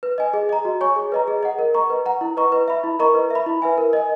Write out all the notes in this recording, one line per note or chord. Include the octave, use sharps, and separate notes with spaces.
B4
D#5 G#5
G#4
D#5 A#5
F#4
C#5 G#5 C#6
G#4
B4 D#5 A#5
G#4
D#5 F#5
A#4
D#5 A#5 C#6
B4
F#5 A#5
E4
B4 D#5 A#5 C#6
B4
E5 B5
E4
A#4 D#5 A#5 C#6
B4
E5 B5
E4
B4 E5 G#5
A#4
D#5 G#5